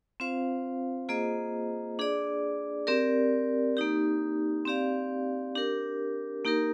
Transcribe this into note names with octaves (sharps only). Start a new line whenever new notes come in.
C4 F4 C5 F5
A#3 F4 G#4 C5 D#5
D4 G#4 D5
C4 G4 A#4 D5
A#3 D#4 G4
C4 G4 D5 F5
D4 G4 A#4
A#3 D#4 G4 A#4